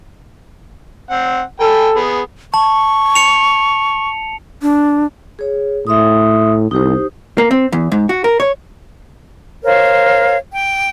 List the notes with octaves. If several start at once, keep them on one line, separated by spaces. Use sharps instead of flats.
C4 F#5
A4 G5 G#5 B5
B3 G#4 B5
A5 C#6
C#7 F7
D4
G#4 C#5
A2 E5 C6 D#6
C2 D#4 G4 C5
A#3
C4
E2
G#2
F#4
A#4
C#5
A#4 C5 C#5 F5
G5